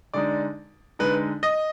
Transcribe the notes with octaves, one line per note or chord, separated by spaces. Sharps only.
D3 G#3 D#4 D5
D3 G#3 D#4 B4
D#5